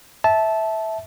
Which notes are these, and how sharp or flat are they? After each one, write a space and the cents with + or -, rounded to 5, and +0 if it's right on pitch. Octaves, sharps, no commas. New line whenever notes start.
E5 -15 A5 -10